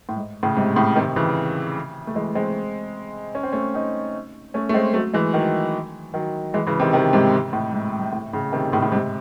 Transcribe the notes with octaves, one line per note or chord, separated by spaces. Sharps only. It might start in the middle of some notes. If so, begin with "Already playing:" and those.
A2
G#2
A2 C#3
G#2 C3
A2 C#3
C3 D#3
C#3 E3
A3
E3 G#3
G#3 C4
C#4
C4
A3 C#4
C4 D#4
A3 C#4
A3
G#3 C4
F#3 A3
E3 G#3
D#3 F#3
D#3 F#3
E3 G#3
C#3 E3
C3 D#3
C3 D#3
G#2 C3
A2
G#2
G#2
A2
A2 C#3
C3 D#3
A2 C#3
A2
G#2 C3